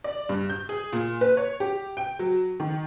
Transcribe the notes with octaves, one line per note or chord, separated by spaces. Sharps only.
D5
G2
G6
G#4
A#2
B4
C#5
G4
G5
F#3
D#3